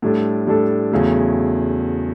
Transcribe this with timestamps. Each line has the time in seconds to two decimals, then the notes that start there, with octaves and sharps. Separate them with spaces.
0.02 A2 G3 D4 A4
0.47 A2 G3 D4 A4
0.92 E2 C#3 F#3 A3